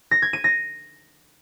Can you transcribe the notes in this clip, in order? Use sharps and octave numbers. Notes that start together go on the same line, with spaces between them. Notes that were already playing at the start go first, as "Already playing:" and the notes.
A#6
G#6
D#7
A#6